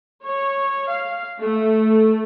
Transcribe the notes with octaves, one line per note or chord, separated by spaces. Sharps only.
C#5
F5
A3